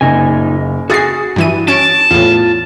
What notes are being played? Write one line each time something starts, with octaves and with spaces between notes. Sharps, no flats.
F#1 A#2 D#4 G#5
F#4 G#4 D#6 A6 A#6 C7
G2 E3 D#7
C#4 A5 D7
E2 A2 F4